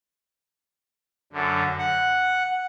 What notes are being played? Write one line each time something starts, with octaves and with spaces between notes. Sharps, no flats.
F#2 D3
F#5